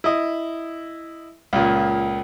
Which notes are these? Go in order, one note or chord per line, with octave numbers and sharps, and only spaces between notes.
E4 D#5
C#2 A#2